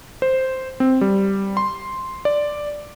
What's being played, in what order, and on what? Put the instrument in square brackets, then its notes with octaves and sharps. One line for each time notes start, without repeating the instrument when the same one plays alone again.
[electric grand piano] C5
C4
G3
C6
D5